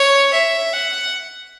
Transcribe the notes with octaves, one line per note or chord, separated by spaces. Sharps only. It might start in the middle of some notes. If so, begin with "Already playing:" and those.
Already playing: C#5
E5
F#5